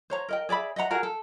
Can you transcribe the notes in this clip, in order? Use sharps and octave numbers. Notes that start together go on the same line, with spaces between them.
C5 C#5 A#5
A#4 D#5 G5
G#4 D5 E5 B5
D#5 E5 F#5 A#5
F#4 G#4 A#4 F#5
A4